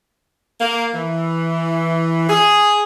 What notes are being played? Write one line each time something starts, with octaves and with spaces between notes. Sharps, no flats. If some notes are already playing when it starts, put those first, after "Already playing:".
A#3
E3
G#4